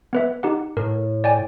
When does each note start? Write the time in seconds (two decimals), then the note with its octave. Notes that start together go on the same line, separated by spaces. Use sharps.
0.13 B3 B4 E5
0.43 D#4 G4 F#5
0.77 A2 A#4
1.24 D5 G5 G#5